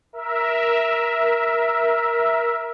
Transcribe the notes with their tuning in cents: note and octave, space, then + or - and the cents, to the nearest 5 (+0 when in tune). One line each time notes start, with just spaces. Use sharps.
A#4 +15 E5 +0